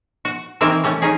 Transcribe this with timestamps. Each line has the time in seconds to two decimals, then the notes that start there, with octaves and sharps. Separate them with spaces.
0.25 F#4
0.61 D#3 E3 C4 E4 A#4
0.84 G3 A3 C#4
1.02 C#4 D#4 G#4